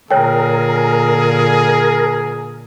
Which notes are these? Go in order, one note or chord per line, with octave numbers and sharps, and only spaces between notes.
A#2 D3 G#4 A#4 C#5 G5